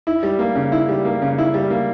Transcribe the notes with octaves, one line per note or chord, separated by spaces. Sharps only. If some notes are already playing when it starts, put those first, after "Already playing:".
E4
G3
A#3
C#3
E4
G3
A#3
C#3
E4
G3
A#3